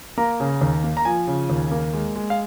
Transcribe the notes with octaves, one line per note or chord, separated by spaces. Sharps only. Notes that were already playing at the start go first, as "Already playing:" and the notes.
A#3 A#5
C#3
D#2
A#3
A#5
F3 G#5
C#3
D#2
A#3
G#3
G#3
F5